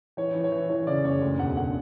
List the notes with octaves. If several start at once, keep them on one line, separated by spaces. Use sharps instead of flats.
E3 C#5
E3
C#5
E3
E3 C#5
C#3 D5
F#1 C#5
D2
E1 F#5
D3 F#5